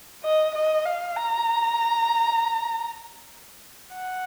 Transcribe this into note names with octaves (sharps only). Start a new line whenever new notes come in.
D#5
D#5
F5
A#5
F#5